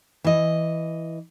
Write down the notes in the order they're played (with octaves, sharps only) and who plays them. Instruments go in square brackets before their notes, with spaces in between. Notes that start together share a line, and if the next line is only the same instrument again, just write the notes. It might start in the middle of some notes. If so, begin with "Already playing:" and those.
[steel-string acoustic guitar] E3 D#5